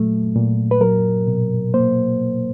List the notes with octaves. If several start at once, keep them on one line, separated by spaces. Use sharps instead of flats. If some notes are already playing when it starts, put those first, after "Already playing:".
Already playing: A#2 F#3 A3
A#2
B4
F#3 A#4
B2
A#3 C5